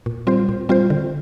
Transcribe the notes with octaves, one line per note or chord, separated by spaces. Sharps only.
A#2
G3 C4 F4 C5
A#2
G3 C4 F4 C5
D3